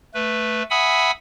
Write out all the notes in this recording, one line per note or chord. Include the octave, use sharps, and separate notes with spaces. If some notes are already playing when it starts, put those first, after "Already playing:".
A3 B4
E5 F#5 G#5 B5 D#6 E6